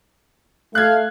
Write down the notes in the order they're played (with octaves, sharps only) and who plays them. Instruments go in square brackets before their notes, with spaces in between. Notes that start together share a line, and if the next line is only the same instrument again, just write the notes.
[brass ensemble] A3 [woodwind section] F5 [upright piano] F#6 G#6